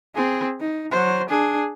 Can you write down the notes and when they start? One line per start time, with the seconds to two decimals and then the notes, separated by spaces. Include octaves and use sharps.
0.16 C4 G#4
0.60 D#4
0.91 F#3 C5
1.29 D4 G#4